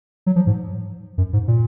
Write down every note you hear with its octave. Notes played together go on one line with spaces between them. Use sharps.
F#3
F3
G#2
F#2
G#2
A#2